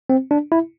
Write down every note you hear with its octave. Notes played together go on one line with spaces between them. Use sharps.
C4
D4
E4